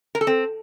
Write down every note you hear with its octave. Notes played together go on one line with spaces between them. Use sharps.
A#4
A4
C4